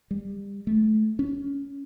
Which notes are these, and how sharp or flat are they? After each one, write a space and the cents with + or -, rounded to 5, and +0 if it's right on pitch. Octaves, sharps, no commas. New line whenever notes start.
G3 +30
A3 -30
C#4 +15